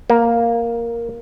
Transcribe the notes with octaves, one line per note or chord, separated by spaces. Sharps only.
A#3